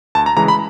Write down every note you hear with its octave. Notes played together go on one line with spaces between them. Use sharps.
D2 A5
A#5
C#3 E3 G#3 A#5
B5